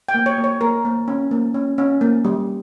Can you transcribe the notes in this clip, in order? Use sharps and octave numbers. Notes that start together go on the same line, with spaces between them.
G5
A#3
C#5
A#3
C#5
A#3 A#4
A#3
C#4
A#3
C#4
C#4
A#3
G3